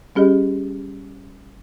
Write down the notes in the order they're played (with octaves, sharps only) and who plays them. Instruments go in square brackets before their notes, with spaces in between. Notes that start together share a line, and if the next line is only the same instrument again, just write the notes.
[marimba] G3 C#4 G4 G#4 D#5